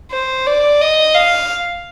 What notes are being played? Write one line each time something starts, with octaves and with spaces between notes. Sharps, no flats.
C5
D5
D#5
F5